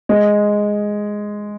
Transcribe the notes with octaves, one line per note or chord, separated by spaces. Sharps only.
G#3